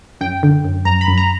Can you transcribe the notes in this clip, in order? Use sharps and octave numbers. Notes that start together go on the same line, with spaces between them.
F#2 G5
D3
F#2
F#2 A#5
B5
F#2
A#5